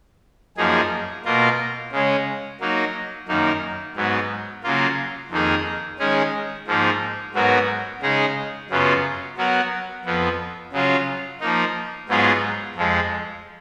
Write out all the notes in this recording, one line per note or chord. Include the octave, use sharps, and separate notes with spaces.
F#2 F3 A#3 D#4 G#4
B2 A#3 F4 A#4
C#3 G#3 C#4
F#3 A#3 D#4
F#2 D#3 A#3 D#4
G#2 F#3 B3
C#3 F#3 A#3 F4
F2 D#3 A#3 D#4 G#4
D#3 G#3 C#4 G#4
G#2 F3 A#3 D#4
G#2 F#3 B3 F#4 A#4
C#3 G#3 D#4 G#4
F#2 C#3 F#3 B3 F4
F#3 B3 F#4 A#4
F2 F3 B3
C#3 F#3 C#4 F4
F3 A#3 D#4
G#2 F#3 B3 F4 G#4
F2 F3 G#3